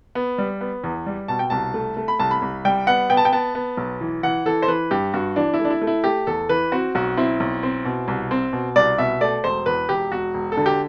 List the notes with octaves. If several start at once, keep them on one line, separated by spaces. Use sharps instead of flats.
B3
G3
B3
E2
G3
B2 A5
G5
C2 A5
A3
A3
B5
C2 A5
B5
C2
G3 G5
B3 F#5
B3 G5
A5
G5
B3 A5
B3
B1
E3
E3 F#5
E3 A4
C5
E3 B4
G2 G4
G2 F#4
E3 D4
E4
A3
D4
E4
A3
E4
A3 G4
E2 A4
E3 B4
C4 F#4
B1 F#4
C4 E4
B1
C4
B2
C2
C4
B2
C2 D5
B2 E5
A3 D5
E1 C5
E2 B4
E1 G4
E1 F#4
E1
A4
D3
G4